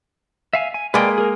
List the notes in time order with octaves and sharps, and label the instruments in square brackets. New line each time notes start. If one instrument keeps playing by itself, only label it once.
[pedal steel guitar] E5 F5 G#5
G#5
[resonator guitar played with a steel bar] G#3 A#3 [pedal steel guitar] B4 D5 G5
[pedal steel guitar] G#4 A#4